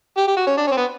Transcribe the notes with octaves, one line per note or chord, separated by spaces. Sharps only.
G4
G4
F#4
C#4
D4
C#4
C4
B3